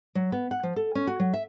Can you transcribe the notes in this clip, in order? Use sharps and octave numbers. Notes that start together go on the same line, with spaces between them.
F#3
B3
F#5
F3
A4
C#4
F#4
F#3
E5